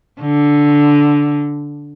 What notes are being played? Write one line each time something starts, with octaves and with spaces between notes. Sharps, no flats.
D3